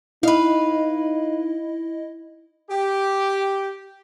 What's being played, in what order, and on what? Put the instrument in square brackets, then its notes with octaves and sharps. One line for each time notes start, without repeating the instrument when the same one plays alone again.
[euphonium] D#4 [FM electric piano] E4 D#5 [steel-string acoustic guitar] B4 F5
[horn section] G4